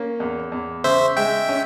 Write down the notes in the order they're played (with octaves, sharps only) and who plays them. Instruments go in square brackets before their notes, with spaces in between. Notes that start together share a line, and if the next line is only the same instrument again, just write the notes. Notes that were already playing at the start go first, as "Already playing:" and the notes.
Already playing: [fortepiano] A#3 C#4
E2
E2
[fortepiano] C#3 [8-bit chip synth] C5 E5
[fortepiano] G#3 [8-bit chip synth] E5 G5
[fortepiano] C#4